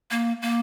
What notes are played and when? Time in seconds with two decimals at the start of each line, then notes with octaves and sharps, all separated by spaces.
0.11 A#3
0.42 A#3